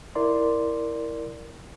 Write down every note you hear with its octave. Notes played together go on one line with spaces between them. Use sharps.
E4 A#4 D5 C6